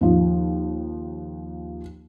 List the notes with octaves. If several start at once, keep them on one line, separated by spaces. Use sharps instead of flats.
D#2 F3